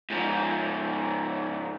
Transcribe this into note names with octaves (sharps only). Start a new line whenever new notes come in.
G#2 F3